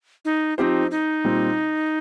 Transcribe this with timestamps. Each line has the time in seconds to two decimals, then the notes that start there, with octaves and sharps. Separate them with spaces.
0.25 D#4
0.58 F3 C4 D#4 F4 G4 C5
0.91 D#4
1.24 A#2 G3 C4